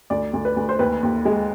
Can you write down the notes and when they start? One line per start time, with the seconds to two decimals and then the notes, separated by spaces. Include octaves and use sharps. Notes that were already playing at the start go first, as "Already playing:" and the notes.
0.10 D2 D5
0.33 D2
0.45 B4
0.56 D2
0.69 C5
0.79 D#2 B4
1.03 D#2
1.25 G#3